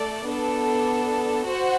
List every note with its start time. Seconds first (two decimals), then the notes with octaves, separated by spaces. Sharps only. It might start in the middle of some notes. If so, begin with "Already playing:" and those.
Already playing: A3 A4 D5
0.27 B3 D4 A4
1.45 F#4 C5 F#5